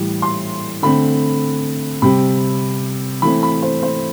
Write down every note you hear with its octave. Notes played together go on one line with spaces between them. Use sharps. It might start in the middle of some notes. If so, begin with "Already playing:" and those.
Already playing: A2 E3 G3
C6
D3 A3 C4 B5
C3 G3 C4 B5
E3 A3 C4 B5
B5
C5
C5